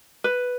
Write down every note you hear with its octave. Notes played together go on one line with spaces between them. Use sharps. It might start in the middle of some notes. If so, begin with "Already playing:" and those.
B4